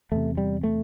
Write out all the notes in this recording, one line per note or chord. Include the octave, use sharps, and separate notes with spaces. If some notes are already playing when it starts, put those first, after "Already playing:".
E2 C3 A3
G3
A3